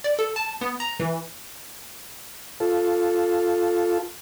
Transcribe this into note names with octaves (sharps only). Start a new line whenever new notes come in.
D5
A4
A5
B3
A#5
E3
F4 A4